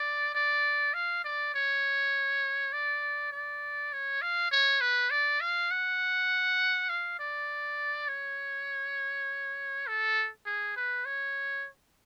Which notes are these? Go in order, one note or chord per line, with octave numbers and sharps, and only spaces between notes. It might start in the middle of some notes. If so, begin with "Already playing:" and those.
Already playing: D5
D5
F5
D5
C#5
D5
D5
C#5
F5
C#5
B4
D5
F5
F#5
F5
D5
C#5
A4
G#4
B4
C#5